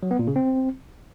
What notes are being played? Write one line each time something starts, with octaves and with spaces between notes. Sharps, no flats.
F#3
B3
A#2
C#3
C4